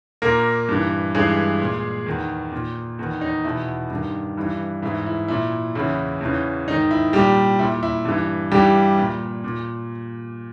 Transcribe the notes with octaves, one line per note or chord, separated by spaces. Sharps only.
A#2 A#3 A#4
G2 E3
G2 E3 G#3 G#4
A#2
E2 D#3
A#2
E2 D#3
D#4
E2 B2 E4
G2 D#3
G2 E3
G#2 E3 E4
E4
A#2 E4
E2 C#3 E3 E4
E2 C#3 E3
G#2 D#3 D#4
E4
A#2 G3 G4
A#2 E4
E4
G2 E3
G2 E3 G3 G4
A#2
A#2